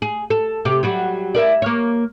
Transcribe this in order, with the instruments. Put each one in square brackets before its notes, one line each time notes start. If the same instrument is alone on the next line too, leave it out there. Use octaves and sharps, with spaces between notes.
[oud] G#4
A4
C3 G4
F#3 G3 F#4
E4 A#4 D5
A#3 C#5